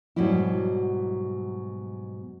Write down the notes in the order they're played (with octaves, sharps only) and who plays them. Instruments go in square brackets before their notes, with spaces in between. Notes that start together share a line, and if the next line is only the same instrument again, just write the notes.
[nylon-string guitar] G#2 B2 F#3 G3 E4